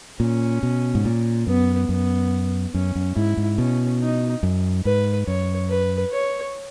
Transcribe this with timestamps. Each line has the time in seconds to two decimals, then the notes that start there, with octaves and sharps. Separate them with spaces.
0.20 A#2 C#4
0.63 B2
0.95 G#2
1.05 A#2
1.47 F#2 B3
1.89 F#2 B3
2.74 F#2 C#4
2.96 F#2
3.16 G#2 E4
3.37 G#2
3.58 B2 C#4
4.00 D#4
4.43 F#2
4.85 G#2 B4
5.27 F#2 C#5
5.70 B4
6.12 C#5